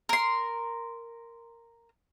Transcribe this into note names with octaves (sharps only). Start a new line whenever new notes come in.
A#4 C6